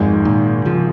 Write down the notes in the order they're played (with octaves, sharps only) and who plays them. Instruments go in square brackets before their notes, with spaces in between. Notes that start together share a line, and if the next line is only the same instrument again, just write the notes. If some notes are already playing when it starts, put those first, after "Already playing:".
Already playing: [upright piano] G#1 G#2 G#3 [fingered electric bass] F2
[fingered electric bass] A#2 D#3
C#3 F3